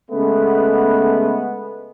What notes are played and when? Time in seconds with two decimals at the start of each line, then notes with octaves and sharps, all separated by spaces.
0.11 C#3 G#3 A3 B3